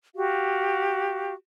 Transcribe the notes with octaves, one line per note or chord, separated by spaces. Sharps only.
F#4 G4 F5